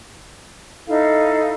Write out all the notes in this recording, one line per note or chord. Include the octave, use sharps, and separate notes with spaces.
D#4 E4 A4 F5